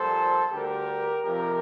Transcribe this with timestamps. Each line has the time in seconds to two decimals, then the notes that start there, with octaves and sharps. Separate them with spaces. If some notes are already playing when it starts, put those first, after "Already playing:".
Already playing: A#1 A#2 G3 A4 C5
0.52 D2 D3 G3 G4 A#4
1.24 F2 C3 F3 G4 A#4